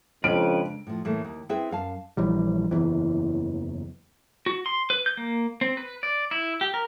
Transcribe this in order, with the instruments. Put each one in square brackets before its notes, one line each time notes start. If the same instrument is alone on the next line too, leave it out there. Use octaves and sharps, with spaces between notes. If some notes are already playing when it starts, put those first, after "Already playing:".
[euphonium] F2 [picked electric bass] C#3 G#3 D4 [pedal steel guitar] C#4 B4 [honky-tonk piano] D7
[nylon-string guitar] A2 F3
A2 E3 A3 A#3
D#2
C4 E4 G#4 B4 E5
F#2 F5 A5
[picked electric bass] A#1 E3 G3
F#1 B1 E2 E3
[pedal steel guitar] F#4
C6
B4
G6
A#3
C4
B4
D5
E4
G4
A#4